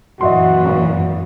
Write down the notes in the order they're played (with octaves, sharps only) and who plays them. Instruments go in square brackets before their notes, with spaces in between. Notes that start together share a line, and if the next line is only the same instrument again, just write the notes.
[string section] F#2 A#2 E3 [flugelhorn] F#4 [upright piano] D#5 E5 C6
[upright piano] G#1